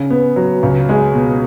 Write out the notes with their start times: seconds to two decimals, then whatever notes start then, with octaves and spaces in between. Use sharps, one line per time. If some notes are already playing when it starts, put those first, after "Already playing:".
Already playing: C#3
0.10 B3
0.36 F#3
0.63 C#2
0.89 G#3
1.14 B2